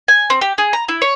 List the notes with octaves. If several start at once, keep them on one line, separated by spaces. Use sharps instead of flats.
G#5
C4
G4
G#4
A#5
E4
C#5